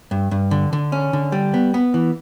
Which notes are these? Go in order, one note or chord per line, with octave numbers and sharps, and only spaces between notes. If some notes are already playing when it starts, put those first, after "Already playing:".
G2
G2
D3
D3
C#4
D3
G3
B3
B3
E3